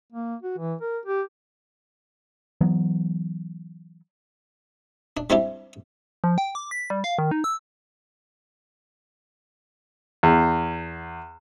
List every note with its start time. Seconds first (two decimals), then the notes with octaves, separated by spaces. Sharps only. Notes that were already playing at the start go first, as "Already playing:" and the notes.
0.13 A#3
0.43 F#4
0.58 E3
0.81 A#4
1.06 G4
2.61 E3 F#3 B3
5.17 D4
5.30 G3 C4 D4 E4 G4
6.24 F3
6.38 G5
6.55 D6
6.71 B6
6.90 G3
7.04 F5
7.19 D#3
7.31 D#4
7.44 E6
10.23 E2